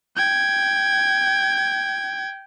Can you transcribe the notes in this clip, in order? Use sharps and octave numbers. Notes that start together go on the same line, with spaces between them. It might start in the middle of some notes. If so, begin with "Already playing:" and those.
G5 G#6